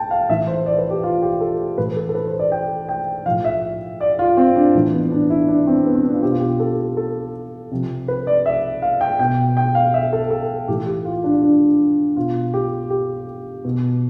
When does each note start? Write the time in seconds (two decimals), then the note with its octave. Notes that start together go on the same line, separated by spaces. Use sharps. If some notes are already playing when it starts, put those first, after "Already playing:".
Already playing: G5 A5
0.11 F5
0.29 A2 E3 E5
0.47 C5
0.66 D5
0.78 B4
0.91 G4
1.03 F4
1.22 G4
1.41 A4
1.78 A2 E3 B4
1.96 A4
2.09 A4
2.15 B4
2.27 C5
2.39 D5
2.52 G5
2.89 G5
3.26 F3 F5
3.30 A2
3.45 E5
4.01 D5
4.19 F4
4.37 C4
4.56 D4
4.75 A2 E3
4.93 B3
5.12 D4
5.30 E4
5.48 D4
5.67 C4
5.86 B3
5.95 C4
6.04 D4
6.13 F4
6.23 B2 G4
6.32 F4
6.40 G4
6.60 A4
6.97 A4
7.71 C3 F3
8.08 B4
8.27 D5
8.46 E5
8.82 F5
9.01 G5
9.19 B2 G5
9.57 G5
9.75 F5
9.94 E5
10.13 A4
10.31 A4
10.68 A2 E3 G4
10.86 G4
11.05 F4
11.24 D4
11.42 D4
12.16 B2 F4
12.54 G4
12.90 G4
13.65 B2